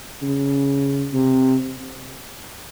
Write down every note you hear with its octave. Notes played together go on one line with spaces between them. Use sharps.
C#3
C3